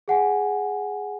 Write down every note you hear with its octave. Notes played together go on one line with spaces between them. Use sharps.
G#4 F#5 G#5